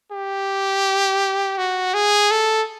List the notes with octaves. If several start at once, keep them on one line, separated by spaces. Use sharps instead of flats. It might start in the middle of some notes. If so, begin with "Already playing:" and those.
G4
F#4
G#4
A4